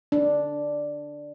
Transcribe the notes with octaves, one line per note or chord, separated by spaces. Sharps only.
D4